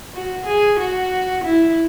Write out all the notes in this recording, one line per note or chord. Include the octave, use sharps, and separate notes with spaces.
F#4
G#4
F#4
E4